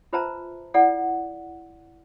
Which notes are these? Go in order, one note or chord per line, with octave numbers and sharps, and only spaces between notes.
F4 B4 C5 E5 A5 A#5
E4 A4 D5 F#5